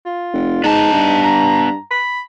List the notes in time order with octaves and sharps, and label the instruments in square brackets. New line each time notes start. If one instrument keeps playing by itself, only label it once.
[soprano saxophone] F4
[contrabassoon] F1
[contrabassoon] G#2 [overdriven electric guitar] B3 A5 [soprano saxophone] D#4
[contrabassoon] G2
[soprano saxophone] A#5
B5